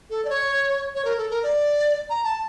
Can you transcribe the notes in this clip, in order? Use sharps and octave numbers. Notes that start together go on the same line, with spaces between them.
A4
D5
C#5
C#5
A#4
A4
A#4
D5
A#5
A5